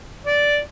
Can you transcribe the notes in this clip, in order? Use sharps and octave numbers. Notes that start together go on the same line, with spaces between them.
D5